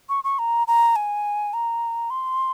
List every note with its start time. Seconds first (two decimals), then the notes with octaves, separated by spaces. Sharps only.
0.09 C#6
0.24 C#6
0.39 A#5
0.67 A#5
0.96 G#5
1.54 A#5
2.10 C6